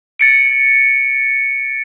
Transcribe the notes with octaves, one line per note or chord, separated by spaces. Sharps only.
A6 C#7 D7